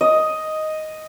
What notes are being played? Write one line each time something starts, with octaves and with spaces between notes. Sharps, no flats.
D#5